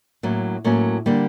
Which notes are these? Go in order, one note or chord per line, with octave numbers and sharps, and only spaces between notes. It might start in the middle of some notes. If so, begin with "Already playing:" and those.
A2 F#3 A#3 C#4
A2 F#3 A#3 C#4
D3 G3 A#3